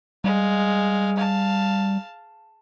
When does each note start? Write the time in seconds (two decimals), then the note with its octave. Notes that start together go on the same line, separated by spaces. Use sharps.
0.24 G3 G#3 F5
1.17 F5 A5